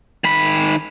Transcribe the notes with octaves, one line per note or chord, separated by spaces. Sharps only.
D#3 B5